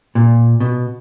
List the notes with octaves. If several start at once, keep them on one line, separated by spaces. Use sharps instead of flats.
A#2
B2